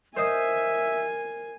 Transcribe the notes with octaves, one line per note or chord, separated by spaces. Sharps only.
A#4 C5 D#5 E5 G#5